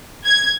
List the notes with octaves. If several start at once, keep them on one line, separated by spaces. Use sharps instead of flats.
G#6